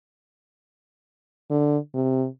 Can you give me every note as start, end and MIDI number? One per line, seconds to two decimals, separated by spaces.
1.51 1.77 50
1.94 2.27 48